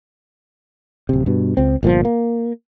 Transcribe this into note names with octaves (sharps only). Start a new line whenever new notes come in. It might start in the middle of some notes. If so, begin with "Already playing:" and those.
D1 C3
G2 B2
C#2 C4
G1 A#2 D#3 F3
A#3